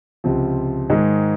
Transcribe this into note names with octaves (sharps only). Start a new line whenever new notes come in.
C#2 C3 F3
G#2 D#3 G#3